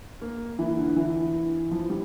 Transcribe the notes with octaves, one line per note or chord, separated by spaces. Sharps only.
A#3
E3
D3
E3
F3
G3